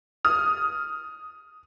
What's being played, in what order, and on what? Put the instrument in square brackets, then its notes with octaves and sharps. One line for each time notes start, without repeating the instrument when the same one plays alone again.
[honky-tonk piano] D#6 F6